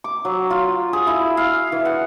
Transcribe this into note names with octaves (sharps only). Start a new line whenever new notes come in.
D6
F#3
F4
G#4
E4
F5
E3
F#5